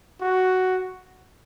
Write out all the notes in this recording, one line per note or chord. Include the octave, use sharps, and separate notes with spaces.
F#4